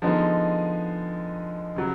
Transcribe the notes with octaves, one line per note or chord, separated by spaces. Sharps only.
D3 F3 G#3 B3 D#4
C#3 F#3